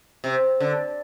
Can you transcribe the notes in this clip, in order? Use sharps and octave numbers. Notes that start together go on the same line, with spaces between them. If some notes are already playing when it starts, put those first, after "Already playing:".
C3
D3